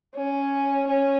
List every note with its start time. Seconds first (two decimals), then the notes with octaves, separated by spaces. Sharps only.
0.15 C#4
0.88 C#4